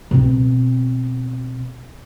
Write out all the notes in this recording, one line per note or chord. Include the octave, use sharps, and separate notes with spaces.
B2 C4